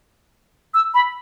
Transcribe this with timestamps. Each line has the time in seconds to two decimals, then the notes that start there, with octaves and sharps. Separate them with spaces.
0.74 E6
0.94 B5